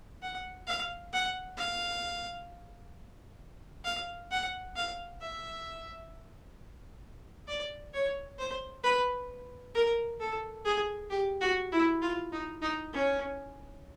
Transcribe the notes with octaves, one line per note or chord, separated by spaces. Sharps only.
F#5
F5
F#5
F5
F5
F#5
F5
E5
D5
C#5
C5
B4
A#4
A4
G#4
G4
F#4
E4
F4
D#4
D#4
C#4